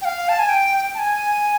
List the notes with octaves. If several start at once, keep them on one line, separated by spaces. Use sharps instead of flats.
G5
F5
A5
G#5
G5
A5
G#5